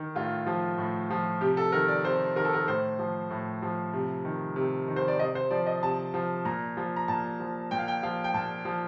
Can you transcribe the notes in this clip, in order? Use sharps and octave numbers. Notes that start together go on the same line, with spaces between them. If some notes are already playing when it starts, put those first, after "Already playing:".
Already playing: D#3
A2 F4
F3
A2
F3
C3 G4
A4
D#3 A#4
D5
C3 C5
D#3 A#4
A4
A#4
A2 C5
F3
A2
F3
C3
D#3
C3
D#3
C5
D5
C3 D#5
C5
F3 D5
D#5
C3 A5
F3
A#2 A#5
F3
A#5
A#2 A5
F3
A#2 G5
F5
G5
F3 F5
G5
A#2 A5
F3